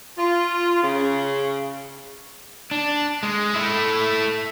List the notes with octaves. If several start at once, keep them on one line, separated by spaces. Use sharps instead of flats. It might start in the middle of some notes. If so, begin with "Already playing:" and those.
F4
C#3
D4
G#3
A3 E4